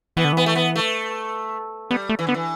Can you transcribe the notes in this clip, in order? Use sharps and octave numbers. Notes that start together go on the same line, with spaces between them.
E3 B3
D3
E3 B3
A3
B3
A3
G3 B3
A3
E3
D3 B3
E3